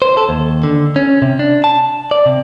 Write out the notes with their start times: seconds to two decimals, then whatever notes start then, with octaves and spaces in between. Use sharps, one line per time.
0.02 C5
0.17 A4
0.29 D#2
0.63 D3
0.96 C#4
1.22 C3
1.39 D4
1.64 A5
2.11 D5
2.26 C3